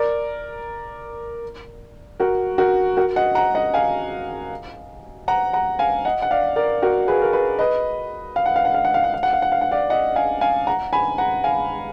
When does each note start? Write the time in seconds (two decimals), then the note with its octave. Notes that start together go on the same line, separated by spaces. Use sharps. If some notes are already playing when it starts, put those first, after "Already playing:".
Already playing: A#4 D5
2.20 F#4 A#4
2.58 F#4 A#4
2.97 F#4 A#4
3.16 D#5 F#5
3.35 F#5 A#5
3.55 D#5 F#5
3.74 F5 G#5
5.28 F#5 A#5
5.53 F#5 A#5
5.79 F5 G#5
6.05 D#5 F#5
6.22 F#5
6.31 D5 F5
6.56 A#4 D5
6.82 F#4 A#4
7.08 G#4 B4
7.22 A#4
7.33 G#4 B4
7.59 B4 D#5
8.36 F5
8.46 F#5
8.56 F5
8.65 F#5
8.74 F5
8.85 F#5
8.94 F5
9.04 F#5
9.14 F5
9.23 F#5
9.33 F5
9.42 F#5
9.52 F5
9.61 F#5
9.71 D5 F5
9.90 D#5 F#5
10.16 F5 G#5
10.41 F5 G#5
10.67 F#5 A#5
10.93 G#5 B5
11.18 F#5 A#5
11.44 F5 G#5